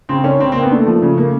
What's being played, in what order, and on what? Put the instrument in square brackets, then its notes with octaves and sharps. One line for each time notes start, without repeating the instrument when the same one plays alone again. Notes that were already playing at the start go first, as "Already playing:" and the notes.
[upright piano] C#3 [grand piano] C4
[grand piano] C#4 [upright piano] D4
[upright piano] C#3 [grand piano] C4
[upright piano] A#3 [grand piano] C4
[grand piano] B3
[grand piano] A3 [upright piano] D4
[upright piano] F3
C#3
A#3